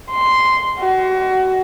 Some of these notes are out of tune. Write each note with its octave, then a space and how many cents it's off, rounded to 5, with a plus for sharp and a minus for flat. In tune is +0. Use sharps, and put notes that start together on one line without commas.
C6 -5
F#4 +25